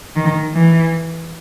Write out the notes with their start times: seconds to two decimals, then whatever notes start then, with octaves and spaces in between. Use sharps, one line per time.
0.16 D#3
0.54 E3